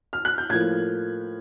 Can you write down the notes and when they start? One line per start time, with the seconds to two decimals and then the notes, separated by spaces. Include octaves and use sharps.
0.13 F6
0.25 F#6
0.38 G6
0.50 A2 F3 A#3 G#6